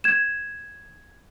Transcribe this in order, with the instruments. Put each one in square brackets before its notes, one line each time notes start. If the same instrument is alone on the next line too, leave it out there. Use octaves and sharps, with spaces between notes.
[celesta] G#6 E7